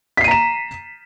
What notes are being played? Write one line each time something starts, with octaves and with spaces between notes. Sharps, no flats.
A#5 B6 C7 D#7 E7